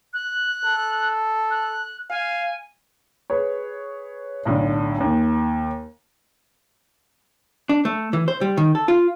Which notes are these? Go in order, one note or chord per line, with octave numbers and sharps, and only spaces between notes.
F#6
A4
F#6
F5 G#5
G#4 B4 C#5
B1 A2 D3
D#2 G#5
D4
A3
E3
C5
G3
D#3
A4
F4